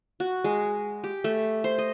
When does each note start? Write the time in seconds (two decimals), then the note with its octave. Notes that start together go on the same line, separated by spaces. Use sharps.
0.20 F#4
0.44 G#3
1.04 G4
1.24 A3
1.64 C5
1.78 D#5